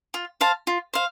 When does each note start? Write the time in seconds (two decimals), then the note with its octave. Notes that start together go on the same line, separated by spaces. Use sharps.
0.14 F4
0.41 C5 F5 A5
0.67 F4
0.94 C5 F5